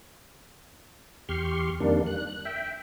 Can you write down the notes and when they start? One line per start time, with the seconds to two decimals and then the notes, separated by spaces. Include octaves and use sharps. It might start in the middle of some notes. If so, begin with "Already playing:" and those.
1.29 E2 G4 C6 C#6 F6
1.80 F2 D#3 G3 A#3 D4
2.06 F#6
2.45 E5 G5